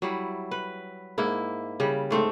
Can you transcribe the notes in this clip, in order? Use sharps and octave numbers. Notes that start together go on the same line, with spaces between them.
F#3 G3 E4
B4
G#2 A#3 E4
C#3 G3
G#2 A3 C4